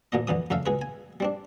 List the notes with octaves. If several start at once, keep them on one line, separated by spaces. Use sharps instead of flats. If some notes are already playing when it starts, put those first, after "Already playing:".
D2 A#2 A3 D#5
F2 D3 E3 D#6
F2 C#3 A3 E5 F5
C#2 G#4 B4
G#5
G3 C4 D4